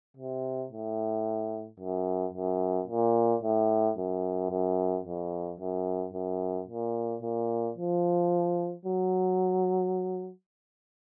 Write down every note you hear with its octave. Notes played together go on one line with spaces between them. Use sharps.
C3
A2
F#2
F#2
A#2
A2
F#2
F#2
F2
F#2
F#2
A#2
A#2
F3
F#3